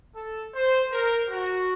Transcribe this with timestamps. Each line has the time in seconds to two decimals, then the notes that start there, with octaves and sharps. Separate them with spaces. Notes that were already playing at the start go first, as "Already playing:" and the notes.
0.16 A4
0.54 C5
0.92 A#4
1.30 F#4